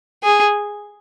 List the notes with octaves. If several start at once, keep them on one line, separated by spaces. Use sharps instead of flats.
G#4